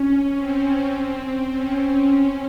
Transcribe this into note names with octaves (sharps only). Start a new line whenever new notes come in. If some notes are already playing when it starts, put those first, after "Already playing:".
Already playing: C#4
C4
C#4
C4
C#4